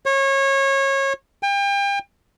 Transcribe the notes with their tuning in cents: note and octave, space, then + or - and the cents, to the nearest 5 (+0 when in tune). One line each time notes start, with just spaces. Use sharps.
C#5 -25
G5 +35